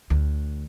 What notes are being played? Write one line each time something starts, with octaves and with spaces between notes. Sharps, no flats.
D2